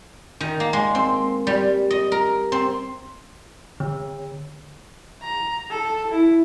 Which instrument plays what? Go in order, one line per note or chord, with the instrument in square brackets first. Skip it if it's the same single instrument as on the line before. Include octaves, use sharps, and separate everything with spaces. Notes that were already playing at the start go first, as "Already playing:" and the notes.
[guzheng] D#3
A#3
G#3
C4
G3
D#5
A#4
C4
[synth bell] D3
[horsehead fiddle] A#5
A4
E4